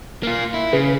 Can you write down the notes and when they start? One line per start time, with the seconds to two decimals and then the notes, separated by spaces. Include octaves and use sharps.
0.23 A#3 F4
0.54 E4
0.73 C#3 G#4 B4